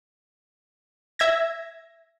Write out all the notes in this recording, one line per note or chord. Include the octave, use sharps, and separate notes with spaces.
E5 G#6 A#6